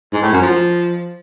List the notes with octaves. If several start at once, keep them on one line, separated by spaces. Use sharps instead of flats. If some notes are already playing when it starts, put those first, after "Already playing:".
G#2
A2
F#2
F3